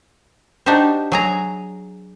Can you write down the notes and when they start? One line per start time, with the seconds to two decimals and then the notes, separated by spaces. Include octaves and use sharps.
0.66 D4 D#4 F#4 G4 C5
1.12 F#3 G#4 A#5